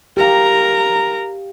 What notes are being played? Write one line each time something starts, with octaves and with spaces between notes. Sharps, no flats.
G4 A#4 F5 A#5